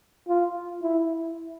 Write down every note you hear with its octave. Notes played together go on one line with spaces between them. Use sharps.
F4
E4